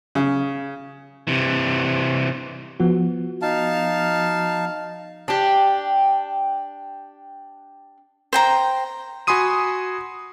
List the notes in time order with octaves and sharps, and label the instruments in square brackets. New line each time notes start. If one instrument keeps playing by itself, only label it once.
[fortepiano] C#3
[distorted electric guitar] C3 E3
[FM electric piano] F3 B3 F#4
[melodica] D#4 F5 A5
[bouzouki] D4 G4
[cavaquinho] C5 G5 A#5
[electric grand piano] F#4 G#5 B5 C6 D#6 D#7